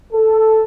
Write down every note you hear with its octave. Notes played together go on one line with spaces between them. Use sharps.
A4